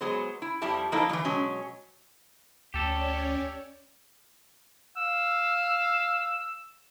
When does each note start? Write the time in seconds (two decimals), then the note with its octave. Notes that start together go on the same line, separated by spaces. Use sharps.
0.01 F#3 G#3 B3 G#4 C5
0.42 E4
0.62 F2 F3 G3 E4 A5
0.92 F3 F#3 A#3 D#4 E4 A4
1.09 E3 F#3 G3
1.25 B2 F#3 G#3 C#4
2.74 D2 C#4 G4 A4 C#5 D5
4.97 F5 E6